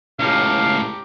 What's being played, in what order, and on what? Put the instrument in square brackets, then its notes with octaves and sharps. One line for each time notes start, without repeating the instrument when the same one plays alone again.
[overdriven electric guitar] C#2 A2 [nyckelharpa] G4 A#5 [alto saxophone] F5